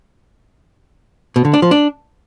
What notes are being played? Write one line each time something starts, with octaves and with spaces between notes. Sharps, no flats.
B2
D3
D4
F3
D4